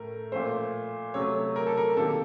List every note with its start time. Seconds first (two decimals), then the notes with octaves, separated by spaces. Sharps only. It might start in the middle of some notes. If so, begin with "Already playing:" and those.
Already playing: A2 A3 A#4
0.32 A#2 F3 A3 C5
1.14 C3 F#3 A3 C#5
1.56 A#4
1.66 A4
1.77 A#4
1.97 C3 D#3 A#3 A4